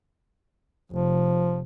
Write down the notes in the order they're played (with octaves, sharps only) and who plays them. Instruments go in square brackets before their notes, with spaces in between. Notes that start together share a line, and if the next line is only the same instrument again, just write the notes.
[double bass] F1 [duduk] F3